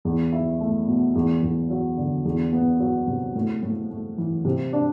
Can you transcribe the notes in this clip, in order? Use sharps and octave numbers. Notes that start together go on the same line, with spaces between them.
E2
E4
A3
B2
E2
E2
F#3
D3
E2
B3
F#3
C3
A2
A2
A3
E3
C3
D4